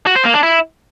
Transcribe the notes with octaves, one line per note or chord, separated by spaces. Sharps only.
F#4
C5
A#3
D4
E4